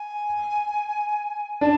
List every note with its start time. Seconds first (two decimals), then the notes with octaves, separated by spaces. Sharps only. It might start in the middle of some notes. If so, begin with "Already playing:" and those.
Already playing: G#5
1.61 D4 A5